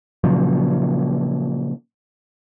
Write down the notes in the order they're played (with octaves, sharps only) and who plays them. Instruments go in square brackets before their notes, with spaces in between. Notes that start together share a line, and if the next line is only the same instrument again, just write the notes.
[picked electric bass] A#2 C#3 F3 F#3